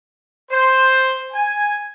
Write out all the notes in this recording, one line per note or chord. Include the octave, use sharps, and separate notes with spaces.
C5
G#5